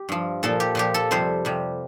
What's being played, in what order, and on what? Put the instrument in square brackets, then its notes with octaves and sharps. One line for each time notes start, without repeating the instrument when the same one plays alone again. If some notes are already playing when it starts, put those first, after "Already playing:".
Already playing: [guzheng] G4
G2 F3
A#2 F3 A4
G4
A#2 F3 G4
A4
F2 C3 G3 C5
F2 C3 G3